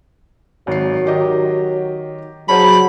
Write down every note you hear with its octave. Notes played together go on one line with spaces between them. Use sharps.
G#1 F#3 C7
D#3 G4 D#5
C#3 F#3 C5 C#5 A5 B5